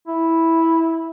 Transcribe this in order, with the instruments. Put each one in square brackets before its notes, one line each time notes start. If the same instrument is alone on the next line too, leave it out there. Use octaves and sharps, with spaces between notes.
[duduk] E4